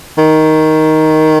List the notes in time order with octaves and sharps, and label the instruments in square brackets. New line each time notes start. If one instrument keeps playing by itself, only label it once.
[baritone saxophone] D#3